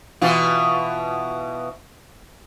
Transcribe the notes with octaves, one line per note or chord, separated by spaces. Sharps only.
B2 E3 F4